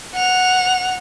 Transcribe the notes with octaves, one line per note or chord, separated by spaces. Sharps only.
F#5 F7